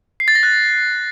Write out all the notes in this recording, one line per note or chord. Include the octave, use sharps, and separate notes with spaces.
C7
A6
A#6
F#6